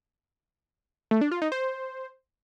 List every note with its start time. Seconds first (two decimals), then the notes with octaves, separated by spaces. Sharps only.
1.11 A3
1.21 D4
1.31 F4
1.42 D#4
1.52 C5